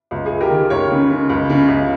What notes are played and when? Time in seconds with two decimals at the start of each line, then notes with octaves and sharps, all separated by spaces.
0.11 C#2
0.26 G#4
0.31 C#2
0.41 G4 A#4
0.50 D#3
0.70 C#2 A#4 C#5
0.91 C#3
1.10 C#3
1.29 C#2
1.50 C#3
1.68 C#2